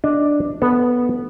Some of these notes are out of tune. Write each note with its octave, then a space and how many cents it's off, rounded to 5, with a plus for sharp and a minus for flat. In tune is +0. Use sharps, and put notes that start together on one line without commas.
D4 +0 D#5 +0
B3 -10 A4 +0